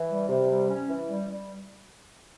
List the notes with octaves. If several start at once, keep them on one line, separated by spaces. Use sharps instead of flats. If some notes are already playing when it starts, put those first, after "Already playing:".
Already playing: E3
G3
C3
G3
C#4
E3
G3
G3